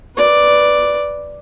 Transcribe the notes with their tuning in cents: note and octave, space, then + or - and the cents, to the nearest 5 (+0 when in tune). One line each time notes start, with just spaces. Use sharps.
B4 +0 D5 +0